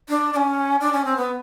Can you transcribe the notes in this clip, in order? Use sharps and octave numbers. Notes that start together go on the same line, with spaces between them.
D4
D4
C#4
D4
C#4
C4
B3